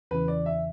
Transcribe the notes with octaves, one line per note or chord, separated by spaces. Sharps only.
E2 C#3 E3 B4
D5
E5